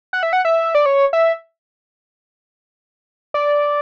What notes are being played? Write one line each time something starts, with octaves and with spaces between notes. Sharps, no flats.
F#5
E5
F#5
E5
D5
C#5
E5
D5